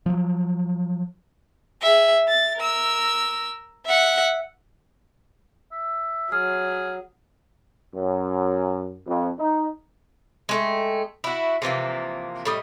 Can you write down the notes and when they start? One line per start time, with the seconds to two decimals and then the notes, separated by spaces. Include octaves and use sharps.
0.06 F3 F#3
1.82 G#4 E5
2.28 A6
2.57 A#4 E6
3.86 E5 F#5
5.72 E5
6.32 F#3 G#4 F6
7.95 F#2
9.07 F2
9.38 D#4
10.49 G#3 A3 G5
11.24 E4 F#4
11.62 C3 E3 F3 A#3
12.45 A2 G3 D#5